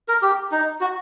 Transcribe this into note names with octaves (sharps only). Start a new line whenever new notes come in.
A#4
G4
D#4
F#4